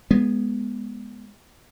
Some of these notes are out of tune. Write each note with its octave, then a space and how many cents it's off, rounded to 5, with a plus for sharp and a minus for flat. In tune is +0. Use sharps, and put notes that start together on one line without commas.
G#3 +0 B3 -10